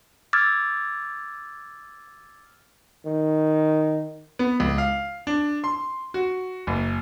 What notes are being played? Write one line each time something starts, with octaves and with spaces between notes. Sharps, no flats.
D6 E6 F6 G#6 A6
D#3
B3
C#2
F5
D4
C6
F#4
F#1